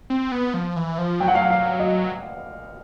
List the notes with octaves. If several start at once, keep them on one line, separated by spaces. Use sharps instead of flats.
C4
B3
F3
E3
F3
F#3 G5
F#5
F5
F#5
F5
D#5